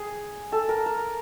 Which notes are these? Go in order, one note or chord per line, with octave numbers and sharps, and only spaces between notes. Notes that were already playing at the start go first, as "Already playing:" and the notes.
Already playing: G#4
A4
A#4
A#4